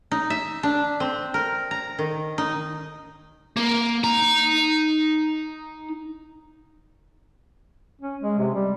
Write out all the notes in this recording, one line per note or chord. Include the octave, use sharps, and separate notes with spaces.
D#4
E5
D4
C4
A#4
A#5
D#3
D#4
A#3
D#4 A#5
C#4
G#3
C3
G3